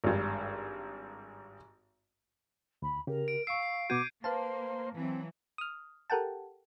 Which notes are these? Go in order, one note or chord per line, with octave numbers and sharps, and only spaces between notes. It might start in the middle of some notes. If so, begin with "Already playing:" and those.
G#1 G2
D2 B5
C#3 G4 A#4
D7
F5 C#6 E6 C7 D7
C7
B2 B3 F#4 D6 G6 G#6 D#7
A#3 B4 C5 F5 A5
E3 F#3 C4
D#6 F6
G4 A4 A#4 F#5 G5 A5